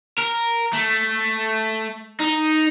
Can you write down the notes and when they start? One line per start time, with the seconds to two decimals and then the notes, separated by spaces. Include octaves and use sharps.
0.19 A#4
0.73 A3
2.20 D#4